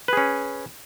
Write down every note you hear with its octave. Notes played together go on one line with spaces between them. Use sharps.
C#4 G#4 B4